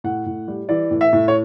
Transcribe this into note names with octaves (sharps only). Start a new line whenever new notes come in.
A2 F#5
A2
G3
E3 D5
A2
E5
A2
C#5